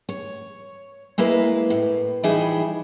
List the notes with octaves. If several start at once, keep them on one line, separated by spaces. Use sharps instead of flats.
C#5
G#3 A#3 E4 B4
A2
E3 F3 G3 D#4 E4 G#4